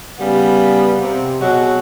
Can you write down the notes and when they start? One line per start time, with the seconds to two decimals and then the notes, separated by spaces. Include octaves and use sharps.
0.19 C#3 G3 B3
1.00 C3
1.40 B2 F#3 G#3 F#4